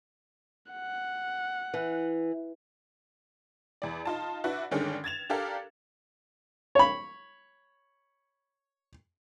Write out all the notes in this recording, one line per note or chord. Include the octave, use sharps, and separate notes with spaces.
F#5
E3
E2 D5
D#4 F4 A5
D4 E4 F#4 B4
G2 D3 D#3 G#3 C#4 D4
G#6 A6 E7 F7
D4 G4 A4 A#4 F5
C#5 B5